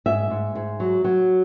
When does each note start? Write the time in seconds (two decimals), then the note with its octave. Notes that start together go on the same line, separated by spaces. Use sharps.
0.06 G#2 E5
0.30 G#2
0.55 G#2
0.80 F#3
1.04 F#3